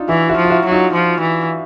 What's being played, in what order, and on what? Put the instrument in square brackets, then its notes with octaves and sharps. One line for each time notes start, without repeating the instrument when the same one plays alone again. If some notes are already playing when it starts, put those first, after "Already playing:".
Already playing: [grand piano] D4 D#4 F4
[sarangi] E3 [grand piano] E4 F#4
[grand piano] E4 F#4
[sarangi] F3
[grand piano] F4
E4 F#4
[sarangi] F#3
[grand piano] D#4 F4
[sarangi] F3
E3